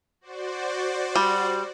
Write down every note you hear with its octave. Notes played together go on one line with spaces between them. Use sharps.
F#4 C5 D5
G3